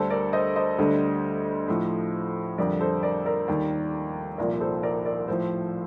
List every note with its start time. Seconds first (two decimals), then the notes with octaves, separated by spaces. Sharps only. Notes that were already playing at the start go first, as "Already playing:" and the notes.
Already playing: D2 D3 G3 A4 C5
0.10 A#4 D5
0.33 C5 D#5
0.56 C5 D#5
0.78 D2 D3 G3
1.68 A2 F3
2.58 F2 D3 G3 A#4 D5
2.80 A4 C5
3.03 A#4 D5
3.26 A#4 D5
3.48 D#2 D#3 G3
4.38 C2 A#2 F3 A#4 D5
4.60 A4 C5
4.83 A#4 D5
5.05 A#4 D5
5.28 A2 F3 A4 C5